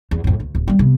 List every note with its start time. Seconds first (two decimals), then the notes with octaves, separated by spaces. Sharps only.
0.11 E2
0.24 F2 A2
0.40 D2
0.55 D1
0.68 G3 A#3
0.79 C3 B3